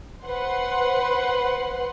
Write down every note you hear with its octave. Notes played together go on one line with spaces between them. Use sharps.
B4 C5 F#5 C6